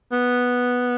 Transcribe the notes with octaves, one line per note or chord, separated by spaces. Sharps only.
B3